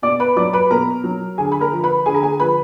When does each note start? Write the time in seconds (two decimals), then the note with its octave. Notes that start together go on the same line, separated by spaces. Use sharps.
0.02 B2 D5 D6
0.20 B4 B5
0.36 F#3 D5 D6
0.53 B4 B5
0.70 B2 A#4 A#5
1.04 F#3
1.38 D3 G#4 G#5
1.52 B5
1.61 A#4 A#5
1.72 F3
1.83 B4 B5
2.06 D3 G#4 G#5
2.14 A#5
2.22 G#4 G#5
2.40 F3 B4 B5